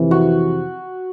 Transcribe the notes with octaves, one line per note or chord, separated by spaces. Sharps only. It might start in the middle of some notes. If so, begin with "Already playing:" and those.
Already playing: F2 C3 E3
F#4